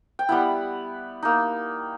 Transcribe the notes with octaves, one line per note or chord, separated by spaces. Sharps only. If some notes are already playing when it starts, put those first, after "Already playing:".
G5
G3 B3 E4 F#5
A#3 D#4